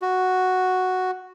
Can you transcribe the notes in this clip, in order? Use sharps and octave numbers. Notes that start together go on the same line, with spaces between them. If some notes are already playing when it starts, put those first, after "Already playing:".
F#4